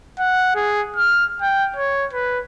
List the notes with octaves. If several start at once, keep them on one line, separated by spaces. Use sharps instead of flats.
F#5
G#4
F6
G5
C#5
B4